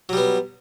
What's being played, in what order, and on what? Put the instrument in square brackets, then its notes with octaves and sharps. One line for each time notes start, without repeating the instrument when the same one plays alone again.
[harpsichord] F#3
G3
B3